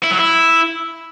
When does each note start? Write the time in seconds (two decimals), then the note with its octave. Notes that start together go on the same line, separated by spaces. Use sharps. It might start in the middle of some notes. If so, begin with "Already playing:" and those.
0.03 E4
0.11 F#3
0.18 E4